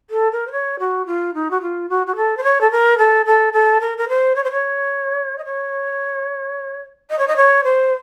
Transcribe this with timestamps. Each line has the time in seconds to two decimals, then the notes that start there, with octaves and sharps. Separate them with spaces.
0.10 A4
0.31 A#4
0.47 C5
0.51 C#5
0.79 F#4
1.06 F4
1.34 D#4
1.50 F#4
1.61 F4
1.89 F#4
2.06 F#4
2.16 A4
2.37 C5
2.43 C#5
2.61 A4
2.71 A#4
2.98 A4
3.25 A4
3.53 A4
3.80 A#4
3.97 A#4
4.08 C5
4.35 C#5
4.44 C5
4.51 C#5
5.38 D#5
5.45 C#5
7.10 D#5
7.18 C#5
7.27 D#5
7.36 C#5
7.64 C5